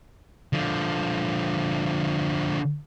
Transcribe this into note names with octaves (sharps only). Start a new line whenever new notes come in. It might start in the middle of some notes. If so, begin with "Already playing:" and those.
D3 F3